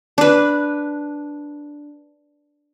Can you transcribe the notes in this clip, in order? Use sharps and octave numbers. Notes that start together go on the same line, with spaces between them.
D4 B4